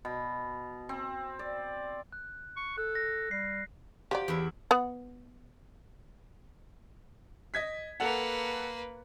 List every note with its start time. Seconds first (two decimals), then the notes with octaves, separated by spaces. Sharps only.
0.05 B2
0.89 C4
1.39 D5
2.13 F#6
2.56 C#6
2.78 A4 F#6
2.95 A#6
3.31 G3 C7
4.11 F3 F#3 G4 D5
4.28 E2 E4
4.71 B3 F#5
7.54 D#5 G#6 B6
8.00 A#3 A4 B4 F#5